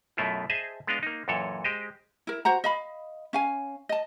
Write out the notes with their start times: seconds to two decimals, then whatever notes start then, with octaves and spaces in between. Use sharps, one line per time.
0.17 F#2 B2 A3 E4 F4
0.50 G#4 C5 D#5 E5 A5
0.87 G#3 B3 D4 D#5 F5
1.03 A#3 D#4
1.28 F#2 A#2 E3 A4 C#5
1.64 G#3 G4 C5 D#5
2.27 E4 A#4
2.45 F#4 C5 F#5 A#5
2.64 D#5 F5 B5
3.33 C#4 F5 G#5
3.89 D#5 A5